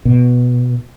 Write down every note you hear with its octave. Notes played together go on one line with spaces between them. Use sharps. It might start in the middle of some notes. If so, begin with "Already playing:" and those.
B2